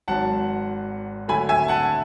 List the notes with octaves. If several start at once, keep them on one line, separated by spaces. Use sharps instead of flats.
G#1 G#2 F#3 F#5 A5
D2 D3 F#3 A3 G#5 B5
E5 G#5
F#5 A5